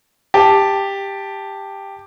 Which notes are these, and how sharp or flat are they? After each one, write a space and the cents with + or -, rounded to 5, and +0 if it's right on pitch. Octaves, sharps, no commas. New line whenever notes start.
G4 +10 A5 +0